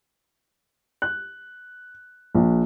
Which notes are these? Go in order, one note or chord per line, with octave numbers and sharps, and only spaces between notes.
F#6
A#1